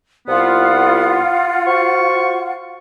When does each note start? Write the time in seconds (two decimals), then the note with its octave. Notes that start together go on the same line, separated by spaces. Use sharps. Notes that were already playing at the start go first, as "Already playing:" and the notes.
0.28 C2 B3 F4 F#5
1.67 F#4 C5 C#6